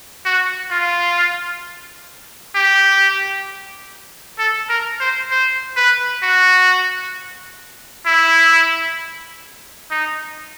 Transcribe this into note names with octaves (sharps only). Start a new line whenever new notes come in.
F#4
F4
G4
A4
A#4
C5
C5
B4
F#4
E4
D#4